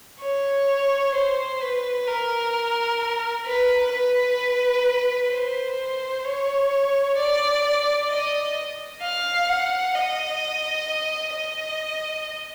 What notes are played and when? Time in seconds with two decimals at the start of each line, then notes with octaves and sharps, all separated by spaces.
0.22 C#5
1.15 C5
1.61 B4
2.07 A#4
3.46 B4
3.92 B4
5.32 C5
6.25 C#5
7.18 D5
8.10 D#5
9.02 F5
9.49 F#5
9.95 D#5
11.35 D#5